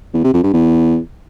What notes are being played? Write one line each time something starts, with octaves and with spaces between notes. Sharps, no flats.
E2
C3
F2
G2
E2